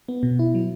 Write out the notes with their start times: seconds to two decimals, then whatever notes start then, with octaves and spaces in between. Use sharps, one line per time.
0.08 B3
0.23 B2
0.39 E4
0.55 F#3